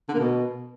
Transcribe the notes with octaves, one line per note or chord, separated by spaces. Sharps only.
D3
A#3
B2